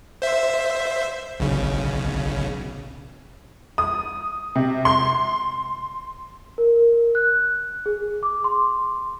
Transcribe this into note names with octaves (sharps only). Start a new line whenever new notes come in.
C5 E5
B1 C#3
D#6
C3
C6
A#4
F#6
G#4
D6
C6